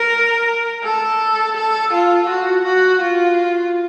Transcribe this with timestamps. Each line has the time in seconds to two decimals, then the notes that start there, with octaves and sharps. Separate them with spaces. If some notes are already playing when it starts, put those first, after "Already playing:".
Already playing: A#4
0.84 A4
1.56 A4
1.93 F4
2.28 F#4
2.65 F#4
3.01 F4